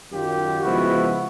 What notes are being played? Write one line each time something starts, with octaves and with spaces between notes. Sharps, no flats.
F#2 D#3 F#3 F4 G4
C#3 F3 G#3 B3 E4 F#4